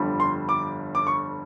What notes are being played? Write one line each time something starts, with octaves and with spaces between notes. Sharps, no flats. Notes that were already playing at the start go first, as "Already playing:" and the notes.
Already playing: G1 F2 D3 G3
C6
D6
D6
C#6